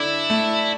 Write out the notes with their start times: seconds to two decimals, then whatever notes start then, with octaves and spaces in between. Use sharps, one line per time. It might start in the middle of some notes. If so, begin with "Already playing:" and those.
Already playing: D3 D4 E4 A4
0.30 A3